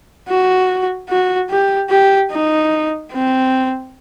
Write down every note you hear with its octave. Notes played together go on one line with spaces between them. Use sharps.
F#4
F#4
G4
G4
D#4
C4